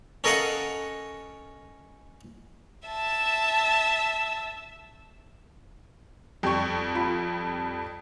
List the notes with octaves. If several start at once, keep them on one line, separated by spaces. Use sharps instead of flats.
C#4 A4 A#4 D#5 F5 F#5
E5 A5
F2 G3 G5 C#6
F4 A5 B5